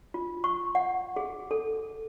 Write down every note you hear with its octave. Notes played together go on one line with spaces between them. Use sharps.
F4
C#6
F#5
G#4
A4